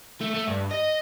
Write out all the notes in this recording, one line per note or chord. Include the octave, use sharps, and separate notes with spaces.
A3
A3
G2
D#5